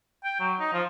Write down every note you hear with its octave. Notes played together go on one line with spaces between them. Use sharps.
G5
F#3
D#4
F3